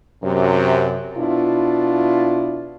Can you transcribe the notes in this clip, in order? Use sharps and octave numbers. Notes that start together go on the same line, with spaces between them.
F#2 C3
B2 D4 E4 F4